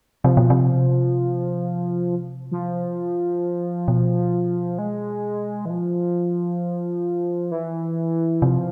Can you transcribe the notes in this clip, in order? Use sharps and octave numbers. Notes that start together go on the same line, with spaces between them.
C3 F3
B2
C3
F3
B2
G#3
E3
F3
E3
C3 F3